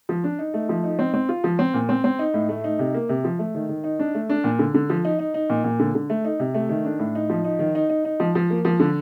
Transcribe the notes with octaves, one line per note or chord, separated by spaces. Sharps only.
F3
D4
D#4
A3
F3
D#4
C4
C4
F4
F3
C4
A#2
C4
C4
D#4
A2
A3
D#4
C3
A#3
C3
F3
A3
D#3
D#3
D#4
D4
A3
D4
A#2
D3
D3
F3
D#4
D#4
D#4
A#2
A#2
D3
D3
A3
D#4
C3
A3
D#3
D4
A2
D#4
F3
D#4
D#3
D#4
D#4
D#4
F3
F3
A#3
F3
D3